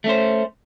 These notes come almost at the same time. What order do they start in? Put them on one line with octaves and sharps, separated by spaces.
A3 C#4 C5